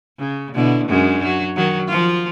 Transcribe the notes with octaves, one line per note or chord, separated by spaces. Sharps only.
C#3
B2 D3 E4
F#2 G#3 D4
F#3
D#3 F#3
F3 F4